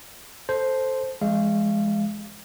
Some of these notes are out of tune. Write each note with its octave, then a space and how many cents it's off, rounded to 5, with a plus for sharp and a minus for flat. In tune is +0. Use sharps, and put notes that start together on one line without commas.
A4 +0 C5 +0 A5 -15
F3 -45 G#3 +0 F5 -30